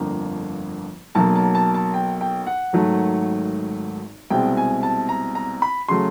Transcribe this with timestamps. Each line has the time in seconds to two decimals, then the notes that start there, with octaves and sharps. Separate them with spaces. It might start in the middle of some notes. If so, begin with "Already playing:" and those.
Already playing: G1 F2 D3 F3 A#3
1.15 B1 B2 F#3 A#3 A5
1.35 A5
1.55 A5
1.74 A5
1.94 G5
2.21 G5
2.47 F#5
2.73 G#1 G#2 D#3 F#3 A3
4.30 C2 B2 G#3 C4 G5
4.57 G#5
4.83 A5
5.09 A#5
5.35 A#5
5.62 B5
5.88 C#3 F#3 A3 C6